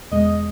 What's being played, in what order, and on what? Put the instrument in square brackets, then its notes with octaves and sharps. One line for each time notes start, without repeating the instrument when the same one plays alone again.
[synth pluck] E2 B2 G#3 [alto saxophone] D#5